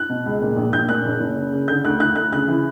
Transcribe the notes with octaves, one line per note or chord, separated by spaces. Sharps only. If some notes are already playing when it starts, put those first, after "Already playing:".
Already playing: F#6
B2
C#2
A#2
A#1
A#1 G6
A#2 F#6
F#1
F#1
C#3
C#3
D3 G6
D2 F#6
D2 F#6
D2 F#6
C#3 F#6
E3